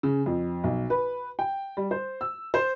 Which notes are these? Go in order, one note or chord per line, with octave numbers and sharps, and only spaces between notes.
C#3
F2
B1
B4
G5
G3
C5
E6
C5